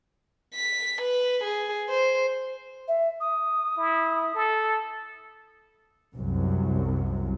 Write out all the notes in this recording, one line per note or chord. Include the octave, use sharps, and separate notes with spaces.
B6
B4
G#4
C5
E5
D#6
E4
A4
C2 F#2